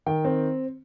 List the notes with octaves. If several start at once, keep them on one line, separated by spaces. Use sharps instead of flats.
D#3 G5
C4